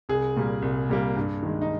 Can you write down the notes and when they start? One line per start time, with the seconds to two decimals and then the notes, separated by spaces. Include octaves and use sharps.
0.09 C2 G#4
0.36 A#2 G3 A#3
0.62 C2
0.89 A#2 G3 A#3
1.17 G2
1.43 D#3 G#3
1.62 D#4